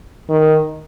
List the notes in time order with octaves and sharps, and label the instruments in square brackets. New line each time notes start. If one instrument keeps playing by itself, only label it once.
[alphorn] D#3